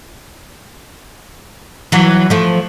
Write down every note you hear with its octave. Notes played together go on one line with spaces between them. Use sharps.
E3 F#3
F3 A3